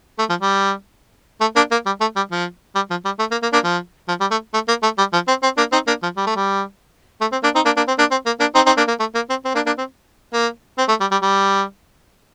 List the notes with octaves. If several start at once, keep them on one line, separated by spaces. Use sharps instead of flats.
A3
F3
G3
A3
A#3 D4
A#3
G3
A3
G3
F3
G3
F3
G3
A3
A#3
A#3
A#3 D4
F3
F3
G3
A3
A3
A#3
A3
G3
F3
C4
C4
A#3 D4
C4 D#4
A#3 D4
F3
G3
A3
G3
A3
C4
A#3 D4
C4 D#4
A#3 D4
A#3 D4
C4
A#3 D4
C4
A#3
A#3 D4
C4 D#4
C4 D#4
A#3 D4
A#3
A3
A#3
C4
C4
A#3 D4
A#3 D4
C4
A#3
C4
A3
G3
G3
G3